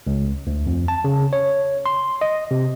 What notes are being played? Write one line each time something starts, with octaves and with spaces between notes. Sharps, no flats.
C#2
D2
F2
A5
C#3
C#5
C6
D#5
C3